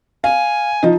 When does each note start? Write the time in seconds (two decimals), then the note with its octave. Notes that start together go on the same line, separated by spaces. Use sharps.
0.24 F5 G#5
0.83 F3 D#4